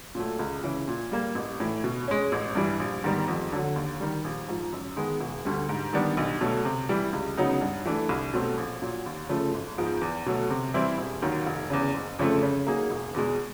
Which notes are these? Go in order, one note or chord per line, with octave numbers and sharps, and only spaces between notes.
A#2 F#3 A3
C#2
C#3 E3
A#2
G3 A#3
A1
A2 E3
B2
G#3 C#4
A1
G2 E3 G3
A#1
G#2 D#3 G3 B3
F2
D3 F#3
D#2
D#3 G3
A#1
G#2 F3
F#2
D#3 G#3 B3
E1
D2 D3 G3
G#2
D#3 G3 B3 D4
B1
B2 F#3 A3
C3
E3 G3
C#2
C#3 F#3 B3 D#4
G2
E3 A3 D4
C2
B2 F#3 A3 C4
A#1
A#2 F#3
D#2
C#3 F3 A3
G#1
G#2 F3 G#3 B3
E2
B2 F#3 A3
C3
E3 G3 C4 E4
E1
D#2 D#3 F#3
F1
E2 C#3
F#1
F2 C#3 F3 A3
C#3
F#3 A#3 D#4 G#4
E1
E2 B2 G#3